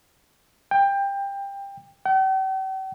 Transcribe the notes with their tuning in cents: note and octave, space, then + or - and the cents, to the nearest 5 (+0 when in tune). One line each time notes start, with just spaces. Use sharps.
G5 +20
G5 -45